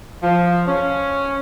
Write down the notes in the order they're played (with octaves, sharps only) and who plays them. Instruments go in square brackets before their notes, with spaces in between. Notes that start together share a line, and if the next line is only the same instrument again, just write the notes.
[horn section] F3
C#4